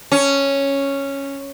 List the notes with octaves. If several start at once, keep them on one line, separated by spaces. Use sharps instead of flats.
C#4